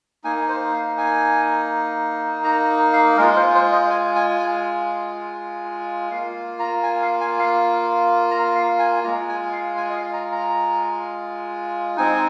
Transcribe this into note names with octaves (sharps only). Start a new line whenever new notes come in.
A#3 D#4 G#5
C5
F5
G#5
A#5
F5
G#3 F4 A#4
C5
C5
D#5
G#5
G#5
G#5
A#3 F4 F5
A#5
G#5
F5
G#5
F5
A#5
F5
G#5
G#3 F4 A#5
G#5
F5
G#5
D#5
F5
A#5
A#5
G#3 C4 D#4 G#5